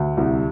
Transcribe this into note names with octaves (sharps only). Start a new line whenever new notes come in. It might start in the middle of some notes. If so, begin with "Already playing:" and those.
Already playing: D2
C2